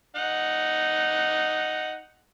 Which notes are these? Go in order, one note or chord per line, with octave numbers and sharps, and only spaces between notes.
D#4 F#5